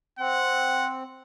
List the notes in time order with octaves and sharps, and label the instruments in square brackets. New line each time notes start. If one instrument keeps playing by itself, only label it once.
[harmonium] C4 [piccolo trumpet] F#5